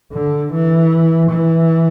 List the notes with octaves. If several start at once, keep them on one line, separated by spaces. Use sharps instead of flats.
D3
E3
E3